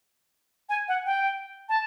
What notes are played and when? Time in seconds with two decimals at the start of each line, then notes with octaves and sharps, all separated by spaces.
0.69 G#5
0.88 F#5
1.06 G5
1.69 A5